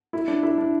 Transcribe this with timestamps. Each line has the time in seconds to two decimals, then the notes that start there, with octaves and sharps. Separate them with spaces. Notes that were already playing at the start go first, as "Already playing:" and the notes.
0.13 E4
0.28 D4
0.43 E4
0.58 D4